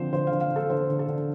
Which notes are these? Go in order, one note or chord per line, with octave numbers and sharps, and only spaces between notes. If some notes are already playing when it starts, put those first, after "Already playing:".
Already playing: D3 F3 C4 C5
D3 C5
D3 F5
F5
D3 A4
D3 C5
D3
A4
D3